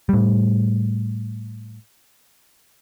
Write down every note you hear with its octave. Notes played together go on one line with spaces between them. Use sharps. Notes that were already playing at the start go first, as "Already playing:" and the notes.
A2 G3